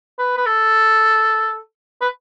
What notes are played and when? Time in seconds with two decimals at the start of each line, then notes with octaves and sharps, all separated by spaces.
0.19 B4
0.37 B4
0.46 A4
2.01 B4